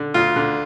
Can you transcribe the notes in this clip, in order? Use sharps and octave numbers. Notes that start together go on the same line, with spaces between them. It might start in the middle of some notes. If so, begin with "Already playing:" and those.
Already playing: D3
D2 F4
D3